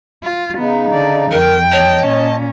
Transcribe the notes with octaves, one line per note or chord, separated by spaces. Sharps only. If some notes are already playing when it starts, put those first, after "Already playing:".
F4
C#3 B3 D#4
D3 D5
F2 A#4 G5
C#5 D#5 A5
A#2 C#4